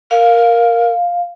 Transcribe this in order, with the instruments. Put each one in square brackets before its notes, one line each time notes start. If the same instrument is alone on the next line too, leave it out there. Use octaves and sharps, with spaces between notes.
[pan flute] A#4 [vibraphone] F5